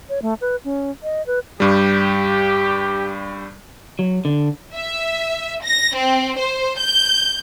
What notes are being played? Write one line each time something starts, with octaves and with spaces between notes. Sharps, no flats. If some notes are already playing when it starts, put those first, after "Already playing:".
C#5
A3
B4
C#4
D#5
B4
G2 G3 G4
F#3
D3
E5
A#6
C4
C5
G6